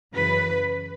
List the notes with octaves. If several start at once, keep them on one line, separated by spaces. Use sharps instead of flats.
F#2 C#3 E3 B4